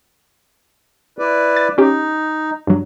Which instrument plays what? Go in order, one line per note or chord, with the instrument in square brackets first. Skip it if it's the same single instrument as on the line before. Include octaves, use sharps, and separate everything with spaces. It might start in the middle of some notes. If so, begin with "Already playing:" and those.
[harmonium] E4 B4 D5
[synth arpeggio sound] A6
[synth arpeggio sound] C#4 G4 [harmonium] D#4
[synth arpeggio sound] G2 F#3